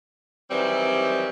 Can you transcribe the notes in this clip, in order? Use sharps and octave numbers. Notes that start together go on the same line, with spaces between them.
D#3 E3 F#3 G3 C4